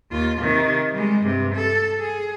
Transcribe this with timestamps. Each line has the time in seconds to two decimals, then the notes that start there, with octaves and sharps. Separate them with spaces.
0.11 D#2 F4
0.41 C3 D#3
0.93 G3 G#3
1.22 G2 C3
1.55 A4
2.01 G#4